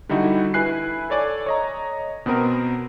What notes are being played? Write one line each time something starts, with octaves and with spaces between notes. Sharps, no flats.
D3 G3 D#4 E4 F#4
E4 B4 G#5 F#6 C7
A4 C#5 D5 G#5
C#5 D#5 A#5
B2 B3 C4 A#4